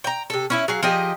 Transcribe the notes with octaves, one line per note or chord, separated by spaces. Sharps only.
G5 A#5
C3 A4
C#4 E4 E5
F#3 G#4 F5
F3 G4 G#4 D#5